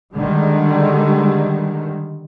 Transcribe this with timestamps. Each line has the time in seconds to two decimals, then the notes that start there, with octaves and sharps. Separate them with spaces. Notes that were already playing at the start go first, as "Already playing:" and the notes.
0.14 D3 D#3 G3 G#3